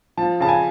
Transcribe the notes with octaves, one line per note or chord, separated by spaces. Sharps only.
F3 A5
C#3 A5
G#5